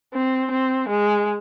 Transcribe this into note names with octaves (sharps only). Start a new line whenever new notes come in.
C4
C4
G#3